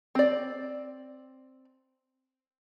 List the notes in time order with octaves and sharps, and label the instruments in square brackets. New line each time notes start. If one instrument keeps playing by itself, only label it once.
[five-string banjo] C4 D5